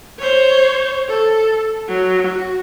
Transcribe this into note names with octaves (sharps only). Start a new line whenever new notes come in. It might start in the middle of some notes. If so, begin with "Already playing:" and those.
C5 C#5
A4
F#3
F#4